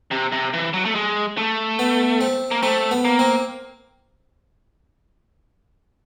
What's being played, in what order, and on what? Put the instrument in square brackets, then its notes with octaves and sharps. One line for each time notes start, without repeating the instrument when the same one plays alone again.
[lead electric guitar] C3
C3
E3
F#3
A3
G#3
A3
[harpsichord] B3
C4
[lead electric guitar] A#3
[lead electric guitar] A3 [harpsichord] C4
[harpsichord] B3
[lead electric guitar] A#3
[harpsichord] C4